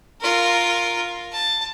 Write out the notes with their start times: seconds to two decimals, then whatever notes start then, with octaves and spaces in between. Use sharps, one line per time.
0.21 F4 A#4
1.32 A5